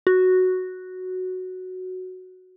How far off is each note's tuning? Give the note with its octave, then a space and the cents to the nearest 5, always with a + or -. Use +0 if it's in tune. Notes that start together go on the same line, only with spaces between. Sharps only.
F#4 +0